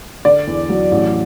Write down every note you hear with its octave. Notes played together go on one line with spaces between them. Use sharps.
D3 D5
E2
F#3
A1